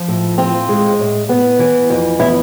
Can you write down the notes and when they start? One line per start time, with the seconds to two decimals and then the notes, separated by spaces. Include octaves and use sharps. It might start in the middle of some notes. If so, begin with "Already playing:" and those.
Already playing: F3
0.08 A2
0.38 C4 F4
0.69 G#3
0.99 A2
1.29 B3
1.59 E3
1.90 F2
2.20 B3 E4